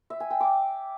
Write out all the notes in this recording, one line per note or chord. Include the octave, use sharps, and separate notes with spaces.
E5
G#5
G5
D6